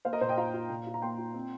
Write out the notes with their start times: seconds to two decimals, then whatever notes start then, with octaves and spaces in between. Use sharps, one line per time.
0.05 A#3 C5 F5
0.13 A#4 D#5
0.21 A#2 C5
0.29 D#5 G5
0.37 F4 F5 A#5
0.54 F4
0.70 A#2
0.87 F4
0.94 A#5
1.02 A#3 G5 C6
1.18 F4
1.34 C4